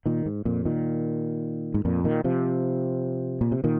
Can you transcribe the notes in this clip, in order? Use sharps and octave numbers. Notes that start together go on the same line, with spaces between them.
A#2 D#3
G#2
F2 A#2
A#2 D#3
G#2
F2 A#2
A#2 D#3
C3 F3
A#2
C3
A#2 D#3